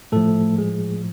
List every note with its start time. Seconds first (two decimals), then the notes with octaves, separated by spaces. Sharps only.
0.12 A2 F3 A3 A4
0.58 G#3 G#4